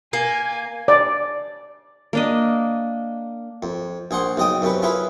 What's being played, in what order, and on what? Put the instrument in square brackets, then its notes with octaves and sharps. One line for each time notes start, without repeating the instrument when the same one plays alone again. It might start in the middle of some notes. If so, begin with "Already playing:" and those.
[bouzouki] A#3 [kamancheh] G#5
[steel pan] D5
[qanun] A#3 D4 D#5
[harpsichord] F2
A#1 G#4 C5 F#5 C6
B1 C#3 D#5 G5 D#6
F#2 C3 C#4 B4
C#4 E4 F4 G#4 B4